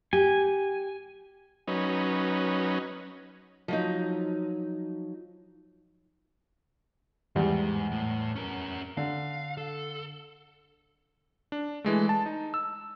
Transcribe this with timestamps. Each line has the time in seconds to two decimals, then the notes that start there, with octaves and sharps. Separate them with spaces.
0.13 G4 G#5
1.68 F#3 C#4 D#4 B4
3.68 F3 F#3 D#4
7.36 E2 G#2 G3
7.92 A2
8.36 C#4 A#4
8.97 D3 F5
9.57 A4
11.52 D4
11.84 E3 G#3 A3
12.09 A5
12.26 D#4
12.54 E6